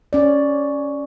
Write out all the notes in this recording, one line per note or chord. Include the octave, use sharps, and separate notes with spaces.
C#4 D5